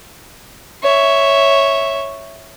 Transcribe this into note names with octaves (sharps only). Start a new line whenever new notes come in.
C#5 E5